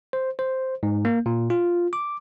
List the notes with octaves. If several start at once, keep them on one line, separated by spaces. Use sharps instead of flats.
C5
C5
G#2
A#3
A#2
F4
D6